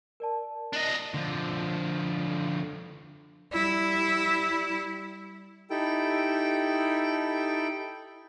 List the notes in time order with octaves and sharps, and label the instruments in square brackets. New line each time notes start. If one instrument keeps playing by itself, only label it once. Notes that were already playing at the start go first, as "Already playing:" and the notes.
[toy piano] A#4 D5 A5
[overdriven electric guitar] D4 D#5
[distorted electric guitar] D3 F3
[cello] G3 E4
[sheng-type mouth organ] D#4 E4 G4 A4 G5